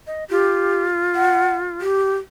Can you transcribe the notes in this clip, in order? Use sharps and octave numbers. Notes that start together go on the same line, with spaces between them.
D#5
F4 G4
F#5
G4